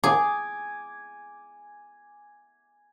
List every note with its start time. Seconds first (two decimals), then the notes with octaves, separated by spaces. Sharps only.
0.04 G#4 G#5 D6